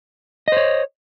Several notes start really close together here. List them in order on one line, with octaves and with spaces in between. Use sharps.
D#5 C5 C#5